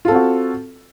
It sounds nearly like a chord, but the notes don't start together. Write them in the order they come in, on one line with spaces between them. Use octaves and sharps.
F4 A4 C4 F#4